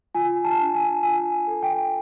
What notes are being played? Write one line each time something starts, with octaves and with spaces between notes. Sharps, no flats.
F4 G#5
A5
D4
G#5
F4 G#5
A4
G5